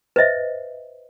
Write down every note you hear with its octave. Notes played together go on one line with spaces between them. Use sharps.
B4 C5 D#5 E5